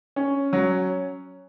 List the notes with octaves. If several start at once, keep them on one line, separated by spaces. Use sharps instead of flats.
C#4
F#3